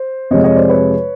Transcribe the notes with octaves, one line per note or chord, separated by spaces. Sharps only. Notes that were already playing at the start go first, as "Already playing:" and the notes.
Already playing: C5
F2 C3 F3 G#3 C#5 D#5
C#5 D#5
C5 D5
B4 C#5